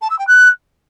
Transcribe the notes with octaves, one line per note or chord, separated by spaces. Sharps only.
A5
E6
G5
F#6